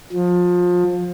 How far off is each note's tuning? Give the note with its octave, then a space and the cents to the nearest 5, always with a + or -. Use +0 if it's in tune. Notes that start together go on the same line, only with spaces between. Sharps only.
F3 +25